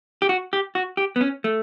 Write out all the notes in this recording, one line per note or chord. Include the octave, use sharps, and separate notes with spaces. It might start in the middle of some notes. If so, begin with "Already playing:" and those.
G4
F#4
G4
F#4
G4
B3
C#4
A3